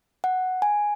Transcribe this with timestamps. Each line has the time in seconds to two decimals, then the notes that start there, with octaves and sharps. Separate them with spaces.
0.24 F#5
0.62 G#5